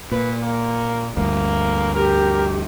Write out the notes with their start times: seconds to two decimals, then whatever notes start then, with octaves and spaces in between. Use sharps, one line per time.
0.12 A#2 B4
0.42 A#3
1.17 D2 G2 A#3
1.95 G4 A#4